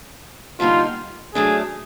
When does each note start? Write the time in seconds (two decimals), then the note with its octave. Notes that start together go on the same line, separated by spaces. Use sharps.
0.60 D3 G3 A#3 D#4 F4
1.35 F#3 A3 D4 G#4